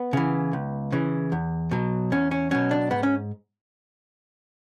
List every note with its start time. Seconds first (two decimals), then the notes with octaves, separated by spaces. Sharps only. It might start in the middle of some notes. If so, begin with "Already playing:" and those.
Already playing: B3
0.13 C#3 E3
0.53 C#2
0.92 C#3 E3
1.32 E2
1.71 B2 F#3
2.12 E2 C#4
2.31 C#4
2.51 B2 F#3 C#4
2.71 D4
2.91 G#2 B3
3.03 C#4